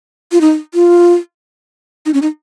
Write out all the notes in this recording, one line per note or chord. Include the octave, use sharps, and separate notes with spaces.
F4
D#4
F4
D#4
C#4
D#4